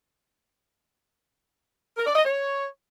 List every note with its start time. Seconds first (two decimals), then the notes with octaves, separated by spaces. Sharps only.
1.96 A#4
2.06 D5
2.15 D#5
2.25 C#5